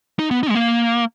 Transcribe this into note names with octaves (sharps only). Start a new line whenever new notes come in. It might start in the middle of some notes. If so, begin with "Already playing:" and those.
D#4
B3
D#4
G#3
A#3